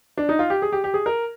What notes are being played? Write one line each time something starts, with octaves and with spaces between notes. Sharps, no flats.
D4
D#4
F4
G4
G#4
G4
G4
G#4
A#4